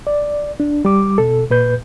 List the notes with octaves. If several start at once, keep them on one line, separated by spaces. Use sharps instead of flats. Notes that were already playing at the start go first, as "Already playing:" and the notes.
D5
D4
G3 D6
B2 A4
A#2 B4 G6